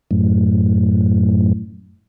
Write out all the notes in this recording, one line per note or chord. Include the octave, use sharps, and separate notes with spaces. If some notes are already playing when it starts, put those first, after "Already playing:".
F#2 A2